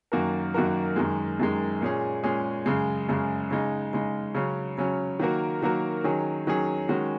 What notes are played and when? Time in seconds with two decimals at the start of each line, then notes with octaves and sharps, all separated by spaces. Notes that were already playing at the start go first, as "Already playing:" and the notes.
0.12 F#2 D#3 A#3 F#4 A#4
0.54 F#2 D#3 A#3 F#4 A#4
0.96 F#2 D#3 G#3
1.40 F#2 D#3 G#3
1.81 A#2 G#3 C#4 G#4
2.24 A#2 G#3 C#4 G#4
2.66 F#2 C#3 G#3
3.09 F#2 C#3 G#3
3.51 C#3 G#3 D#4
3.93 C#3 G#3 D#4
4.35 C#3 F#3 C#4
4.78 C#3 F#3 C#4
5.19 D#3 F#3 A#3 F#4 A#4
5.62 D#3 F#3 A#3 F#4 A#4
6.04 D#3 F#3 C#4 G#4
6.47 D#3 F#3 C#4 G#4
6.89 D#3 G#3 C#4 F#4